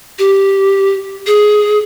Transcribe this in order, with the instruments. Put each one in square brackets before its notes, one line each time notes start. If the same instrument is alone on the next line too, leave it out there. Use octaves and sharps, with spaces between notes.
[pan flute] G4
G#4